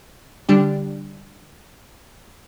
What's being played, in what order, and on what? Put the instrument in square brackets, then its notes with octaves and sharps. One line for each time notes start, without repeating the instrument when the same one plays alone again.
[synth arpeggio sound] D3 G3 D4 G4